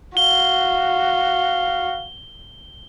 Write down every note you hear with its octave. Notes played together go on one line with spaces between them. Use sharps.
F#4 F5 G7